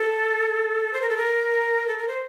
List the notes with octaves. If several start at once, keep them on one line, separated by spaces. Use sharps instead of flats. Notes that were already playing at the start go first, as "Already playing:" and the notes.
Already playing: A4
C5
A#4
A4
A#4
A4
A#4
C5